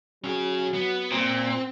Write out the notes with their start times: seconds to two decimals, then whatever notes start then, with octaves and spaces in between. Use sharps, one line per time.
0.24 F#3 C#4 G#4
0.74 B3
1.12 A#2 C4